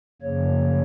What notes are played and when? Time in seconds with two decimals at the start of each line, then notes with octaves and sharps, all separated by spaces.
0.22 F#2 C#3 F3 A#3 C#5